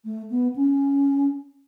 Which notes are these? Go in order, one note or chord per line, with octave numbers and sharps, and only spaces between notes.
A3
B3
C#4